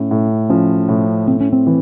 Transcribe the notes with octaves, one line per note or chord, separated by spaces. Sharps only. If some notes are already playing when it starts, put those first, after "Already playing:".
Already playing: A2 C#4
A2
F3 C#4
A2
A2 C4
C#4
C4
E3